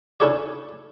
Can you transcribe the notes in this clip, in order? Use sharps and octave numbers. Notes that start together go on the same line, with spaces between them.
C#4 D4 E4 A4 C#5 D5